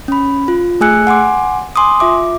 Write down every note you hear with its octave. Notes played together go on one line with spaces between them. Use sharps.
C#4 B5
F4
A3 G#4 G#5 E6 F#6 C#7
F#5 G#5 C6 D6
G#5 C6 D6 D#6
F4 E5 D6